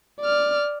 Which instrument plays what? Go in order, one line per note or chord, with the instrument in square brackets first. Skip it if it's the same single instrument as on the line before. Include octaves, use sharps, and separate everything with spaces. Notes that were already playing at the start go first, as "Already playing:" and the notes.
[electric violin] D5 F6